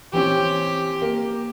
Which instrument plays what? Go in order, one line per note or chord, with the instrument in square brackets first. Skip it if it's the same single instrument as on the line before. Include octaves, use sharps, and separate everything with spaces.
[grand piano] E3 C4 C#4 [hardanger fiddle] G4
[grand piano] A#3